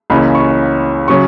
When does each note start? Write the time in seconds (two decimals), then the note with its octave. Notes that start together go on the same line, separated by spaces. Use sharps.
0.10 C#2 C#3 E3 A#3 C#4 B5
0.35 C#6
1.08 C#3 F#3 C#4 C#6